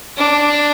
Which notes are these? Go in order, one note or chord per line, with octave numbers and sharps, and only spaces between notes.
D4